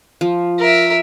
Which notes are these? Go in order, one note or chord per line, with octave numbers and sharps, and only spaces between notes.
F3
A#4 E5